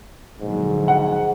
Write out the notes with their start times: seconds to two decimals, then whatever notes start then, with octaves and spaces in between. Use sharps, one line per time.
0.40 A#1 G#2 D3 F#3
0.88 F#5